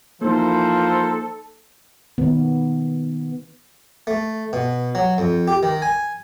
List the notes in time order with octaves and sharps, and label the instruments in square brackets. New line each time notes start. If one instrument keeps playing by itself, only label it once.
[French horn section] E3 F3 [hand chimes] A#3 D#4 [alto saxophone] A4 [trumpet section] A#4 C5
[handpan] D#3 B3
[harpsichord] A3
B2
F#3
F2
G4
D#3
G#5